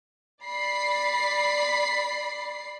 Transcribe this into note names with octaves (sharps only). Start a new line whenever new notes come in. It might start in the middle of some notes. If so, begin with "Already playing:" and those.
D5 B5 C7